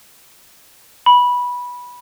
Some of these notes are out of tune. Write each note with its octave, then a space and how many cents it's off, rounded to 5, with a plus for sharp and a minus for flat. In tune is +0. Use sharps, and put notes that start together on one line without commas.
B5 -15